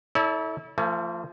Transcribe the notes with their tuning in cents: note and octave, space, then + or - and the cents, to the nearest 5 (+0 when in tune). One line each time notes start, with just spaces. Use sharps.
E4 -35 A4 -5 C#5 +45
F3 -15 A3 +35 G#5 +35